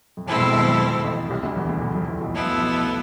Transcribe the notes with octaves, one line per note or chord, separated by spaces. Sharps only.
F2
E2 B2 G#3 C4 E4 A4
F2
G#1 G#2
F2
F2
A1 A2
C2 C3
D2 D3
E2 E3
D2 D3
E2 E3
F2 F3
E2 E3
B1 B2
B2 F3 B3 E4 A4
A2
B1 B2
A2